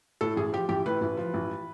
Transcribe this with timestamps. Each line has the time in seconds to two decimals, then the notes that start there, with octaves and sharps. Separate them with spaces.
0.21 A2 A4
0.37 A1 G#4
0.53 F3 G4
0.69 A1 G4
0.85 A2 B4
1.01 A1
1.17 F3
1.34 A1